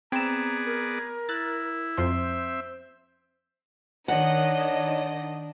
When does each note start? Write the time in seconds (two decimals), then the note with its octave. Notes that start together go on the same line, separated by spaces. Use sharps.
0.12 B3 C4 G#4 D5 A#5 E7
0.66 A#4
1.29 E4 F#6 A6
1.97 F2 F3 C4 C5 E5 C6
4.08 D#3 D4 C#5 D#5 F#5